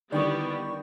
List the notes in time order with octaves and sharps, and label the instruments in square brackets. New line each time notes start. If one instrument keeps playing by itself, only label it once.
[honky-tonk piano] D3 D#3 [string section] G3 B3 [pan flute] E4 [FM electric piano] D5 G5 C#6